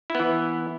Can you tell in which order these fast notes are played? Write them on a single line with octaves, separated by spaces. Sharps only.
E4 B3 E3